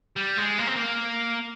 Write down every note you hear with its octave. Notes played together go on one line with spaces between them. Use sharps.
G3
G#3
A#3
C4
A#3